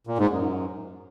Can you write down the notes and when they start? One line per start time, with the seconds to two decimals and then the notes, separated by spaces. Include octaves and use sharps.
0.07 A#2
0.18 G#2
0.30 F#2